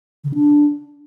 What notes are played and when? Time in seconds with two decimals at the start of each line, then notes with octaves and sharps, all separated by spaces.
0.24 D3
0.29 C#3
0.34 D4